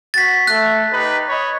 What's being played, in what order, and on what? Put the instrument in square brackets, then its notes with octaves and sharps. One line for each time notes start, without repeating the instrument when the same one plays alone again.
[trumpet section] F#4 [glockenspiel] A6 B6
[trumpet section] A3 [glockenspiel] F#6
[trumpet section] D#4 G4 B4
C#5 D#5 B5